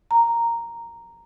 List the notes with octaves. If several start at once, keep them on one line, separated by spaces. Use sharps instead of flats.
A#5